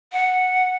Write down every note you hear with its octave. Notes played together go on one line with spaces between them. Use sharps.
F#5